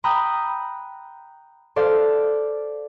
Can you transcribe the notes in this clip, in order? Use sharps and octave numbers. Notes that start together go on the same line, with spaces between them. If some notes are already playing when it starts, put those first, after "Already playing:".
G5 A#5 B5 D#6 E6 F#6
A4 C5 D5 F5